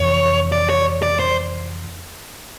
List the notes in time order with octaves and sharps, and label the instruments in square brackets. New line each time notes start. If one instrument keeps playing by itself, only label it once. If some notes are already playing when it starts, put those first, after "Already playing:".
Already playing: [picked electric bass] F2 C3 E3 [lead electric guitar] C#5
[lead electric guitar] D5
C#5
D5
C5